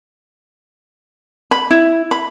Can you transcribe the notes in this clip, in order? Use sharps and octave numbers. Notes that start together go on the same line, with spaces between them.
B5
E4
B5